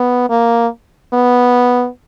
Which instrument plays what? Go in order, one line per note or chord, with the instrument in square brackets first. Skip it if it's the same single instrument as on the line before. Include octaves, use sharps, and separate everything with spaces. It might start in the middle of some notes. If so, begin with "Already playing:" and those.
Already playing: [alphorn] B3
A#3
B3